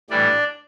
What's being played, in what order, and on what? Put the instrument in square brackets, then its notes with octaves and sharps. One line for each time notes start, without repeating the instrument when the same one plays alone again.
[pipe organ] A2 E3 G3 D4 D5